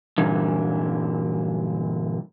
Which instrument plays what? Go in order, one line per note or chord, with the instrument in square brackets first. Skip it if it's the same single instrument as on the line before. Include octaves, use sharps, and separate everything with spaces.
[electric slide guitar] G2 A#2 D3 E3